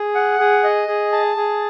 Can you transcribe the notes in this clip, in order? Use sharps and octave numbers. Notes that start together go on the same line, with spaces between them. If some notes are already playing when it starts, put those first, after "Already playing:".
Already playing: G#4
F#5
G#4
D#5
G#4
A5
G#4